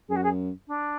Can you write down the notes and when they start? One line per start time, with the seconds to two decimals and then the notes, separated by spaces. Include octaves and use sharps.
0.08 F#2 G#4
0.16 F#4
0.23 G#4
0.67 D4